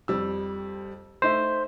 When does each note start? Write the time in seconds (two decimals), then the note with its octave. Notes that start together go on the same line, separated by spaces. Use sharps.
0.08 F2 G3 E6
1.22 A3 D#4 C5 E5